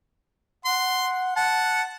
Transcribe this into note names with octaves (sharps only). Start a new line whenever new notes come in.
F#5 C6
F#5 A5